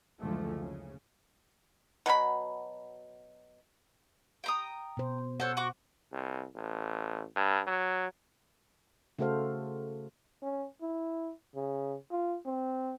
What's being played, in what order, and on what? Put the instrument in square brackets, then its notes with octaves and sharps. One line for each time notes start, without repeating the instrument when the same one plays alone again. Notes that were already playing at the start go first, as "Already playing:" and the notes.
[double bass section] F#1 D2 F3 G#3 A3
C#3
[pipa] B2 F#3 C#4 B5
[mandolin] G5 A#5 D#6
[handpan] B2 C5
[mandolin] A4 C5 C#5 [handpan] F#5
[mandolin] F#4 C#6 D6
[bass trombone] C2
A1
G2
F#3
[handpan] C#3 A3 F#4 A4 C5 F5
[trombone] C#4
E4
C#3
F4
C4